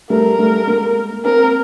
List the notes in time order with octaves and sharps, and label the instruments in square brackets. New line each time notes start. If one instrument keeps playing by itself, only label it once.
[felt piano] G3 A3 [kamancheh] A#4
[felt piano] G3 A3
G#3 A#3
[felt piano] A#3 C4 [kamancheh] A#4